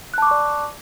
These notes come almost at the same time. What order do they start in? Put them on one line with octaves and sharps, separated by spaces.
F#6 A5 D6 C#6 D5